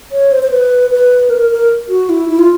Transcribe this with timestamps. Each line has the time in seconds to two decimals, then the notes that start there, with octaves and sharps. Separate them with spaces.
0.12 C#5
0.32 C5
0.43 C5
0.51 B4
0.91 B4
1.30 A#4
1.51 A#4
1.89 F#4
2.09 E4
2.29 E4
2.39 F4